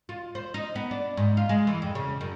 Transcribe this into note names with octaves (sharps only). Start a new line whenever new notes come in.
F4
C5
D#4
B3
D4
G#2
F4
G#3
E3
F2
C#3
F#2